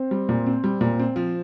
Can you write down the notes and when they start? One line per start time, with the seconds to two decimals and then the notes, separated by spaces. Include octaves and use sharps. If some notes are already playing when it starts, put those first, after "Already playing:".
Already playing: C4
0.11 G3
0.29 A#2
0.46 C4
0.64 G3
0.81 A#2
1.00 C4
1.16 F3